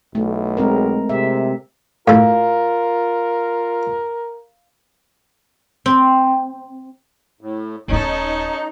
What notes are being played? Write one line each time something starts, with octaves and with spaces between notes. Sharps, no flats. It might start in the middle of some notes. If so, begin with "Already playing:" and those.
B1 A3
G#3 C4 A#4
C3 E5
A2 F4 A4 A#4 F5
C4
A2
D#1 B3 C#4 D#4 A4